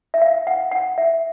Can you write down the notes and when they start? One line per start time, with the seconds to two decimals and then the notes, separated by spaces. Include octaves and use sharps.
0.14 E5
0.22 F5
0.47 F#5
0.72 F#5
0.98 E5